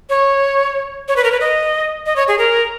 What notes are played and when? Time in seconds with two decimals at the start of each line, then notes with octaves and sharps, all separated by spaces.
0.10 C#5
1.08 C#5
1.16 B4
1.24 A#4
1.32 B4
1.41 D#5
2.06 D#5
2.16 C#5
2.28 G#4
2.38 A#4